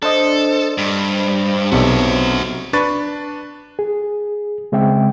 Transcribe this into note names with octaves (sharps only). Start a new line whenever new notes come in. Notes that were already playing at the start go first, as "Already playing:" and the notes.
D4 A4 C5 D#5
G2
B1 C3 F#4 E5
D4 B4 C#6 A6
G#4
C#3 G#3 C4 E5 G5